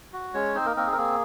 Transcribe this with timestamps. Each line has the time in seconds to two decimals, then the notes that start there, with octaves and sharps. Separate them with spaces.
0.13 F#4
0.34 G#3 C#4 C#5
0.55 C4 D#4 C5
0.66 A#3 A#4
0.77 A#3 C4 A#4
0.87 G#4
0.93 A#4
0.97 A#3 G#4